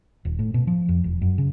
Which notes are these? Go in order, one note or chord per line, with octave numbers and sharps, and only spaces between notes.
D#1
A2
B2
F3
F2
E1
F#2
C#3